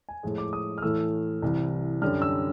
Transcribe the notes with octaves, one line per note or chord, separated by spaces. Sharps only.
G#5
A2 F3 G#3
D6
D#6
F6
A2 E3 A3 E6
C2 C3 E3
F#2 D3 G3 F6
E6